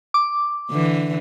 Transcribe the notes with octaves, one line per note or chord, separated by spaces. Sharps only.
D6
D3 E3